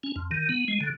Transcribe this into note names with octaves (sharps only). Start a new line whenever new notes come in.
C#4
F2
D#3
B3
G#3
D3